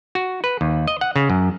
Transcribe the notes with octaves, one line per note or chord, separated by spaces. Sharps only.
F#4
B4
D#2
D#5
F#5
C#3
F#2